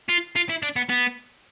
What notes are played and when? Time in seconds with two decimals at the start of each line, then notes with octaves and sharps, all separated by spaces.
0.09 F4
0.36 F4
0.49 E4
0.63 D4
0.76 B3
0.89 B3